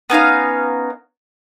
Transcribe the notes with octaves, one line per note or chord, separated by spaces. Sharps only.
B3 C#4 D#4 F5